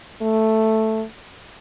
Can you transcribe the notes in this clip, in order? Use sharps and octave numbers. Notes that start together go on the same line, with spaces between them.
A3